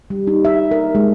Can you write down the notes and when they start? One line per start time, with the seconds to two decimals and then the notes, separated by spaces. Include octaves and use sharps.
0.10 G3
0.27 D#4
0.45 E5
0.71 A#4
0.95 G#3